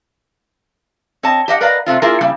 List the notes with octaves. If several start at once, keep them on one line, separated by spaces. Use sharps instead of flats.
C4 C#5 D#5 A5
G4 D#5 E5 F#5
A#4 B4 D5 D#5 F5 A#5
C3 A3 C4 F4
A#3 E4 F4 G#4 A#4
C#3 G3 A#3 E4